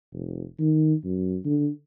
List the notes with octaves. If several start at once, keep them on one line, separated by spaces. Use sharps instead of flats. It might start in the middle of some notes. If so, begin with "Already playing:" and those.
F1
D#3
F#2
D3